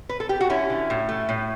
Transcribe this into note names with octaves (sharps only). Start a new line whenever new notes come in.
B4
A4
G4
F#4
D3 C#4 E4
D3
A2
A3
A2